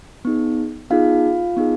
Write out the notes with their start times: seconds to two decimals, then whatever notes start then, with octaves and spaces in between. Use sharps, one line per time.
0.25 B3 D#4 G#4
0.90 B3 D#4 F4 G#4 F5
1.57 B3 D#4 G#4